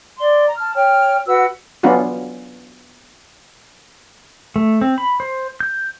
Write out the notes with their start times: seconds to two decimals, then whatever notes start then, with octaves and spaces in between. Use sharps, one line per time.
0.19 D5 C6
0.46 A#5
0.58 A5 F6
0.75 C#5 G5 F6
1.26 F#4 B4 F#5 E6
1.83 F#3 B3 C#4 D4 F4 F#4
4.56 A3
4.81 C4
4.98 B5
5.20 C5
5.60 G6